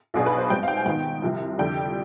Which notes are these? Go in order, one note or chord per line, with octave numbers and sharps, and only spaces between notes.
B1 B2 B3 D4 G#4
B4
C5
G#2 G3 C4 G5
F5
G5
G#5
G#2 D#3 B3 D#4 G5
C2 C3 F3
F2 D3 G3 D4 G5